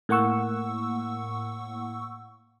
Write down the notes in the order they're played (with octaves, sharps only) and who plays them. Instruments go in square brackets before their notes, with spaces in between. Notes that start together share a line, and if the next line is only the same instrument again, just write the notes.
[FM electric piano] A2 A#3 F#5 C#6 E6